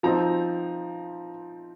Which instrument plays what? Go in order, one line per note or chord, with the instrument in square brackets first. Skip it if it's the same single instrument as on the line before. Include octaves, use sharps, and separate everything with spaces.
[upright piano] F3 C4 D#4 A#5